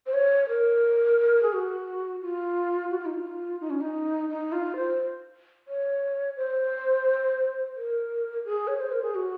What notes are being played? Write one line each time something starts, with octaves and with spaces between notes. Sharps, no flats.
C5
C#5
A#4
G#4
F#4
F4
F#4
F4
D#4
F4
D#4
C#4
D#4
D#4
F4
C5
C#5
C5
A#4
G#4
C#5
C5
A#4
G#4
F#4